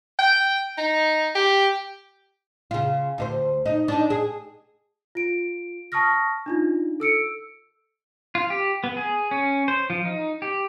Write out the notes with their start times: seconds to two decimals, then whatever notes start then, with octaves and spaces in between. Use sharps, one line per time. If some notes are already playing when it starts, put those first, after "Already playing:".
0.19 G5
0.78 D#4
1.35 G4
2.71 C#3 F4
3.18 D2 D#4 C5
3.66 D#4
3.88 D4 D#4
4.10 G#4
5.15 F4 D7
5.92 A5 C#6 D#6 F6 A#6
6.46 D4 D#4 F4
7.00 A4 E6 C#7 D7
8.35 F4
8.50 G4
8.84 B3
8.97 G#4
9.31 C#4
9.68 C5
9.90 F3
10.05 D#4
10.42 G4